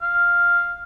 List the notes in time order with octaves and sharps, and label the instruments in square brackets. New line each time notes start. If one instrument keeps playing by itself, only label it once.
[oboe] F5